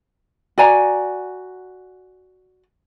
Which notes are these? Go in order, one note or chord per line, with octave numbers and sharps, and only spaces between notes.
F#4 D5 G#5 A#5